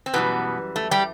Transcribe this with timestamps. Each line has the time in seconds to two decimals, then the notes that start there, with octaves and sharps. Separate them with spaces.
0.06 C4
0.14 F#2 B2 E3 G3 B3
0.76 A3
0.91 G3 G4